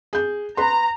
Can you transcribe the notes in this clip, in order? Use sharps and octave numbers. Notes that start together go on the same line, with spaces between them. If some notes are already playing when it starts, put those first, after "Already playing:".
G#4 G6
B4 A#5 C6